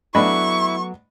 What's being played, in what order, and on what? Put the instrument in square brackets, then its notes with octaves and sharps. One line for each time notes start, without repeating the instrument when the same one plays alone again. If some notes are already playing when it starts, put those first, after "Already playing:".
[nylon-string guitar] F#3 A3 B3 [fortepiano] D4 D#5 B5 [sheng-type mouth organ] E4 [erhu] C#6